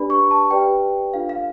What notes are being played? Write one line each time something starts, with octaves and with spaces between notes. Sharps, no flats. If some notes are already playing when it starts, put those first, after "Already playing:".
Already playing: D4 G4 B4 D5 B5
C#6
A5
G4 B4 D5 G5
D4 F4 A4 F5
F5